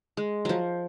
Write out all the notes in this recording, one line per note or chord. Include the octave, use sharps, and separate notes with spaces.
G#3
F3 F#3